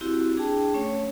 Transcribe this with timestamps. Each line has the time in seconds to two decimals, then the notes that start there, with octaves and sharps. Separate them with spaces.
0.01 C4 E4 F#4 G4
0.37 D4 G#4 G5 A5
0.74 A3 C#4 C#5